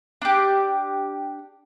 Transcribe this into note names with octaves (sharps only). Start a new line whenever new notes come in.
D4 G4